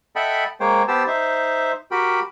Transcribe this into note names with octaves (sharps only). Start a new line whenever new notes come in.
A4 D#5 E5 F#5 G5 B5
G#3 A#3 C5 C#5 G5
B3 G4 C5 A5 E6
D#4 C5 E5
F#4 G4 A#4 G5 B5